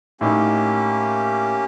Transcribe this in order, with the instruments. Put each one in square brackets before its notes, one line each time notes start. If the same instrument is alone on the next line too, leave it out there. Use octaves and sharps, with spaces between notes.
[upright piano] A2 D#4 [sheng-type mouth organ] A#3 C#4 G4